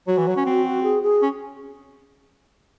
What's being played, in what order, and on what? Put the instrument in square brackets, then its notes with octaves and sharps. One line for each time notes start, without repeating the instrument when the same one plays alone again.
[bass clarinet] F#3 [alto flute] F#4
[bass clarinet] E3
F#3
C#4
C4
[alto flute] G#4
G#4
[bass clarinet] C#4